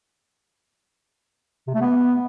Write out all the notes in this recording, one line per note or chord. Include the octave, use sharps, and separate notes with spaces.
C3
A3
B3